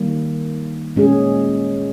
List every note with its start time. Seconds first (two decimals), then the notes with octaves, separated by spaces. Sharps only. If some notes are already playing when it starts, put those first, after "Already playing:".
Already playing: D#3 G3 A#3
0.96 A#2 G#3 C#4 G#4